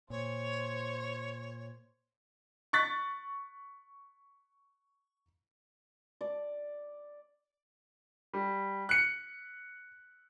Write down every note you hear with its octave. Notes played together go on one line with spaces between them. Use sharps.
A#2 C5 C#5
C#6 F#6 A6 B6
D5
G3
F#6 C#7